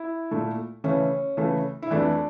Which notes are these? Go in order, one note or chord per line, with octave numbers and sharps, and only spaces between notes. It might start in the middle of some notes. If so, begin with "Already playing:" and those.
Already playing: E4
A#2 A3
C#3 E3 A3 C#4
C#3 E3 A3
E4
F2 E3 A3 D4